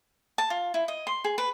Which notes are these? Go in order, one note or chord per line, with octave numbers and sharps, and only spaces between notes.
A5
F4
E4
D#5
C6
G#4
B4